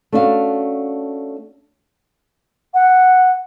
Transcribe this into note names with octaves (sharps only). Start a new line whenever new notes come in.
A3 C#4 D4 E4 F#4 F5
F#5